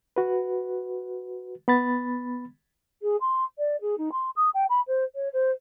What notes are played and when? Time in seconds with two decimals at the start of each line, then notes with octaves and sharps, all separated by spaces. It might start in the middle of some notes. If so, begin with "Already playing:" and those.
0.16 F#4 B4
1.68 B3 B5 A6
3.02 G#4
3.20 C6
3.58 D5
3.81 G#4
3.98 D#4
4.12 C6
4.36 D#6
4.54 G5
4.69 B5
4.87 C5
5.15 C#5
5.33 C5